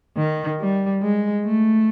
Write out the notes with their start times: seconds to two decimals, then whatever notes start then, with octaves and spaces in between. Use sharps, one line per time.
0.17 D#3
0.60 G3
1.02 G#3
1.46 A3